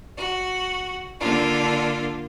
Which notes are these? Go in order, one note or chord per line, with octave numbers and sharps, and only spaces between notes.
F#4
D3 A#3 D4 F4